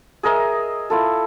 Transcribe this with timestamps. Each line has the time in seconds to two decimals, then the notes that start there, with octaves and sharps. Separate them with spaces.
0.23 G#4 A#4 D#5 E5
0.90 E4 F4 A4